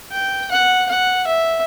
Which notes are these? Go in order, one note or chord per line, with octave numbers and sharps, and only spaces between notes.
G5
F#5
F#5
E5